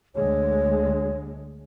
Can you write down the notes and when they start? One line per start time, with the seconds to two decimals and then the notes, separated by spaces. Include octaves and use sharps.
0.15 D2 D3 G#3 C#5